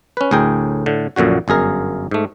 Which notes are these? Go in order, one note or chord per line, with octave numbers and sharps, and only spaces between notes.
C#4 B4
D2 A2 G#4 A#4 G5
A2 D3
A#1 F#2 A#2 D3 F#4
G1 F#2 G#4 A#4
G#2 A3